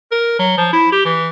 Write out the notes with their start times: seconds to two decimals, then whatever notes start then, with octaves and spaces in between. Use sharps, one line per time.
0.12 A#4
0.39 F#3
0.58 F3
0.73 E4
0.92 G4
1.05 E3